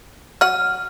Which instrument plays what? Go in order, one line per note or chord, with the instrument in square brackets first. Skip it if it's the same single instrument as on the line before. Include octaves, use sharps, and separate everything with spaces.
[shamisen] F#3 F#5 [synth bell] F6